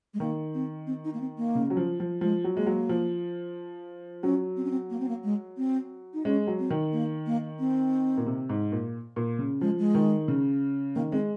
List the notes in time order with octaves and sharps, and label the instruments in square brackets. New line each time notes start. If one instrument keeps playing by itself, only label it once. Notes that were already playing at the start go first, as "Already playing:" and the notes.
[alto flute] G#3
[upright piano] D#3 [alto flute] A#3
[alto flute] C4
C4
D#4
A#3
C4
A#3
[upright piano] C#3
F#3
F3
F3
[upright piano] F3 [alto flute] G#3
[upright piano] F#3
[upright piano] G#3 [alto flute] A#3
[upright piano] F#3
F3
[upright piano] F#3 [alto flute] C#4
[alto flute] C4
C#4
C4
A#3
C4
A#3
G#3
C4
D#4
[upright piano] G#3 [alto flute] C#4
[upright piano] F#3
[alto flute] C4
[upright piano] D#3
[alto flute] A#3
A#3
C4
[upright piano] A#2
C3
G#2
A#2
A#2
C#3
[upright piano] F3 [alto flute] G#3
[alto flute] G#3
[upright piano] D#3
C#3
[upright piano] D#3 [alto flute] A#3
[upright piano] G#3 [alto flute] C4